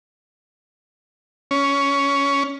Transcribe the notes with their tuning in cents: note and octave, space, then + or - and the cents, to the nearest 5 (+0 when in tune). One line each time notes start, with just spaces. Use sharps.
C#4 +15